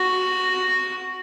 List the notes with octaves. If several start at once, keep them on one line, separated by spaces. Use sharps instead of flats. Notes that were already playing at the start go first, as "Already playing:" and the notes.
Already playing: F#4